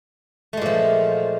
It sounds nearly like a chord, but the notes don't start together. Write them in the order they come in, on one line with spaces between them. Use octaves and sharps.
A3 G#3 A#2 F3